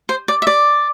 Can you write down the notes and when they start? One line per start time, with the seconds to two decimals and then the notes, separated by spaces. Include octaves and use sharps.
0.09 C5
0.28 D5
0.42 E5
0.47 D5